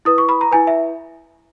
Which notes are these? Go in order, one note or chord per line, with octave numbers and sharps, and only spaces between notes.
E4 B4 D#6
C#6
B5
A#5
E4 B4 G#5
E5